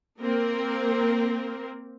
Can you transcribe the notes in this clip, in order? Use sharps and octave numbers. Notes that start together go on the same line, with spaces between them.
A#3 C4 A#4